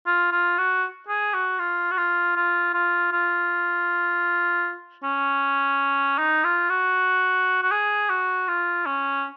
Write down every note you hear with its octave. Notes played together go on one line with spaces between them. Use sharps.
F4
F4
F#4
G#4
F#4
F4
F#4
F4
F4
F4
F4
C#4
D#4
F4
F#4
F#4
G#4
F#4
F4
C#4